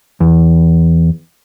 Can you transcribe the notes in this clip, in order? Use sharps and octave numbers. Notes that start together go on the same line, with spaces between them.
E2